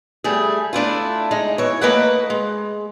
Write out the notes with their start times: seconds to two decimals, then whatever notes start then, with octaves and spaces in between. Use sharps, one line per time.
0.24 G3 A3 G#4
0.73 A3 D4 E4 F4
1.31 G#3 D#4
1.58 E3 C#5
1.81 A3 A#3 A#4 B4 D#5 F#5
2.30 G#3